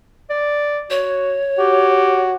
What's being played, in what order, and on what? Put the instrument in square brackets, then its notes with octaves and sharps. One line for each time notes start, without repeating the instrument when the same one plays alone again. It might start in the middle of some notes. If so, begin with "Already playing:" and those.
[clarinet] D5
[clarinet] F#4 [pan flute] C#5
[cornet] F#4 [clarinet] G4